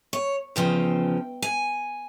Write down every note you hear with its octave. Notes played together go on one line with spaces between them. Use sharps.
C#5
E2 C#3 F3 G5
G#5